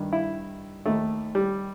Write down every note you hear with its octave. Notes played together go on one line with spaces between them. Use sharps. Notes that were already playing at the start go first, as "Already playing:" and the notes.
Already playing: G2 D#3
E4
D#2 D#3 A3
G3